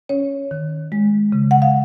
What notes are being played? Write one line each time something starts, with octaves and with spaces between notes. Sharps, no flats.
C#4 C#5
D#3
G#3
C#3
F#5
F5